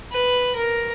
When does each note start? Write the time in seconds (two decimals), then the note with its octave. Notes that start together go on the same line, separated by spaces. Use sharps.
0.12 B4
0.55 A#4